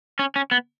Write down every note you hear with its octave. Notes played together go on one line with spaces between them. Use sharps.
C#4
C#4
B3